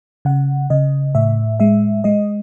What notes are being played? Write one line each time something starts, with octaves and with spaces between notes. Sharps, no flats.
C#3 F#5
C#3 D#5
A2 E5
G#3 E5
G#3 D#5